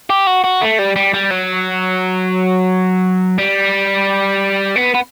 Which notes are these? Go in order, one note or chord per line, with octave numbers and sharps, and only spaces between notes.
G4
F#4
F#4
A3
G3
G3
G3
F#3
G3
B3
B3